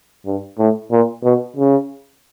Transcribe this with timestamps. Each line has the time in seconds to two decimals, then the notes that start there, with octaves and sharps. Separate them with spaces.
0.26 G2
0.58 A2
0.91 A#2
1.24 B2
1.56 C#3